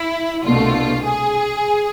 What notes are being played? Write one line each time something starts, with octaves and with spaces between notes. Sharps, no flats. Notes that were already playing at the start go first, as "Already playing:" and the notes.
Already playing: E4
C2 B2 A3 D4 F4
G#4